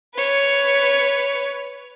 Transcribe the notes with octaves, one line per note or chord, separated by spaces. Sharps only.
B4 C#5